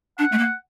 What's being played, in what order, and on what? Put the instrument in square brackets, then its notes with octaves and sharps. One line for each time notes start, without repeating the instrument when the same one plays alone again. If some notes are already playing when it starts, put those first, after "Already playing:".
[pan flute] D4 [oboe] F#5
[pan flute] A3
A#3